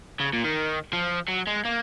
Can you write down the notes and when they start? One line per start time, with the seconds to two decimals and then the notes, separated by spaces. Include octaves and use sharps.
0.20 C#3
0.33 A#2
0.44 D#3
0.93 F3
1.29 F#3
1.47 G#3
1.65 A#3